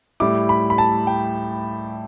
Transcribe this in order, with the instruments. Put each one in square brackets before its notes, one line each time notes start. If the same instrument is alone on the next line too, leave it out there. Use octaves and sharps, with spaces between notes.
[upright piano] A2 G3 E4 [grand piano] D6
[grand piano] B5
B5
A5
G5